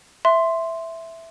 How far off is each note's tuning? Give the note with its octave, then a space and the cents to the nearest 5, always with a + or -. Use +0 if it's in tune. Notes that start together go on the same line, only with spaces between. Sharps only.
E5 +0 C6 +0